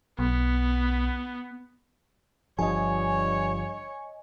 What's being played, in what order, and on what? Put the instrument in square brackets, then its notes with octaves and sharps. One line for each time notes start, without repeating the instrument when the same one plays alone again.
[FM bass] B1 [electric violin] B3
[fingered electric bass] G1 F3 [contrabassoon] G2 [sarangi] C#5 [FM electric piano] D#5 G#5